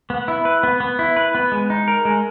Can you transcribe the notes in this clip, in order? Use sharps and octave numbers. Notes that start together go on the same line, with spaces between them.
B3
E4
B4
B3
B3
E4
B4
B3
G#3
D#4
A#4
G#3